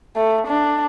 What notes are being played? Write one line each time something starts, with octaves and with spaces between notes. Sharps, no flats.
A3
D4